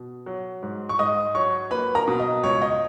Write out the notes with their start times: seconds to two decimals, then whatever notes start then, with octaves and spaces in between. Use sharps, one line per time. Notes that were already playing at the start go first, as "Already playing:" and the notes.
Already playing: B2
0.26 F#3
0.63 G#2
0.89 C#6
0.99 G#2 D#5 D#6
1.35 F#3 C#5 C#6
1.71 A#3 B4 B5
1.95 A#4 A#5
2.08 B2
2.19 D#5
2.43 C#2 C#5
2.62 D#5